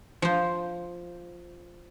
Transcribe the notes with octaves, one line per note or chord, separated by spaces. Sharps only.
F3 C5